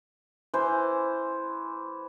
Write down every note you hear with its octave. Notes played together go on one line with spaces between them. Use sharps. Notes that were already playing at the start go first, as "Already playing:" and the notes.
E3 C5